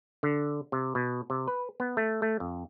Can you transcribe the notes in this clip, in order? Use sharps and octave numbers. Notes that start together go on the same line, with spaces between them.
D3
C3
B2
C3
B4
B3
A3
A3
F2